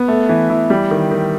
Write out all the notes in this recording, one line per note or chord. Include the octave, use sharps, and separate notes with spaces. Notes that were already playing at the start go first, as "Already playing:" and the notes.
Already playing: B3
A3
E3
E3
G3
D#3
D#3